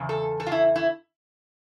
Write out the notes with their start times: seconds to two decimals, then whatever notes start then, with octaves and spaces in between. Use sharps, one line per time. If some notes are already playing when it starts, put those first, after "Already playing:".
Already playing: E2 C#3
0.09 A4
0.40 A4
0.46 F4
0.52 E4
0.76 E4